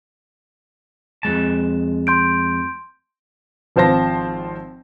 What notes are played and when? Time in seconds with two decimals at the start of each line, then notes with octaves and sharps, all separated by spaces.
1.23 F2 G#3 A5
2.07 C6 G6 D7
3.76 G#1 F3 C4 C5 A5 A#6